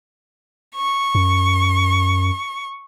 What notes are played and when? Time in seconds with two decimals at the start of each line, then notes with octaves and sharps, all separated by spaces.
0.75 C#6
1.15 F#2